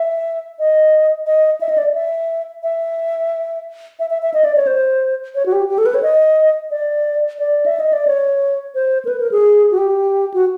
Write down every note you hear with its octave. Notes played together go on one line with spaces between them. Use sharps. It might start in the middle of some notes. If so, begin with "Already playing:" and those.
Already playing: E5
D#5
D#5
E5
D#5
D5
E5
E5
E5
E5
E5
D#5
D5
C#5
C5
C#5
F#4
G4
G4
A4
B4
C#5
D#5
D5
D5
E5
D#5
D5
C#5
C5
A#4
B4
A#4
G#4
F#4
G4
F#4